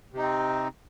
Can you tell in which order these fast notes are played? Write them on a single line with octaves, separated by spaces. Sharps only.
C3 D#4 C4